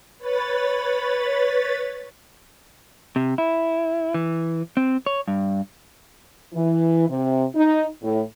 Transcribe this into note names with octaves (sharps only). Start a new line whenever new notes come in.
B4 C#5 B5 A6
C3
E4
E3
C4
C#5
G2
E3
C3
D#4
A2